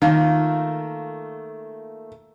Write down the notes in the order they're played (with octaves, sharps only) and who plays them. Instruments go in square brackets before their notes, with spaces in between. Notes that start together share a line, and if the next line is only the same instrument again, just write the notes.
[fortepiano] D#3 [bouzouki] A3 A#3 F4